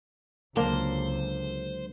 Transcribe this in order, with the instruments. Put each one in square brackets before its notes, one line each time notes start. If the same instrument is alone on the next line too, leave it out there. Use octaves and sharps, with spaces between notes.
[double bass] C#2 [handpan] D3 F#3 G#3 [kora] A#3 D4 A#4 [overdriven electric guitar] C5